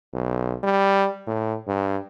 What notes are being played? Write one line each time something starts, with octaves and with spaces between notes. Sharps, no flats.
B1
G3
A2
G2